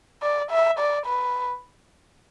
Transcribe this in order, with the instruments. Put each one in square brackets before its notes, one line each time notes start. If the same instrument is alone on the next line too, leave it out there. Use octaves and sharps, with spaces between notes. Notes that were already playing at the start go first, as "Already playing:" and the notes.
[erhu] D5
E5
D5
B4